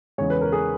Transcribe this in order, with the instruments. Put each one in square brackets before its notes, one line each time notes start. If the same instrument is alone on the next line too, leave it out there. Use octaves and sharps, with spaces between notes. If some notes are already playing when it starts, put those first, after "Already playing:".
[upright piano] E2 C#3 G#3 C#5
B4
A#4
G#4